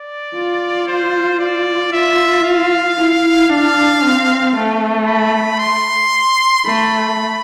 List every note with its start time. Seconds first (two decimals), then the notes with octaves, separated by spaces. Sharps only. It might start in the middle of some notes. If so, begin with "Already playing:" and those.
Already playing: D5
0.35 F4
0.87 C5
1.39 D5
1.92 F4 E5
2.44 F5
2.97 E4
3.49 D4 F5
4.02 C4
4.55 A3
5.07 B5
5.59 C6
6.65 A3 B5